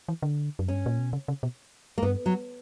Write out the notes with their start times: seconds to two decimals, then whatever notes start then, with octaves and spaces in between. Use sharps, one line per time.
0.08 E3
0.22 D3
0.59 F#2
0.68 G2 C#4
0.86 A#2
0.99 B2
1.13 C#3
1.28 C#3
1.43 B2
1.98 A#3
2.03 G2 B3
2.26 F#3